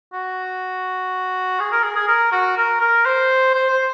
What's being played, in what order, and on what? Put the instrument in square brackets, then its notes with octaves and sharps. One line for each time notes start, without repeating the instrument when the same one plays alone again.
[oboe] F#4
G#4
A#4
G#4
G#4
A#4
F#4
A#4
A#4
C5
C5
C5